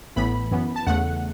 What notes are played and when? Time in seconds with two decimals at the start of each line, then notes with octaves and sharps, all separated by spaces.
0.16 A1 A2 E3 B3 B5
0.51 F#2 E3 B3
0.76 A5
0.87 E2 C#3 A3 F#5